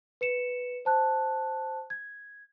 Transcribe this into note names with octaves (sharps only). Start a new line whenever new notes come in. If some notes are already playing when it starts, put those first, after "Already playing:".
B4 C#7 E7
C5 A5 F#6
G#6